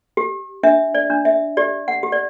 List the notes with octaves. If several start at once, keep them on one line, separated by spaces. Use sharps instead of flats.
G4
D4 E5
D5
D4
E5
G4 D5
F#5
G4
D5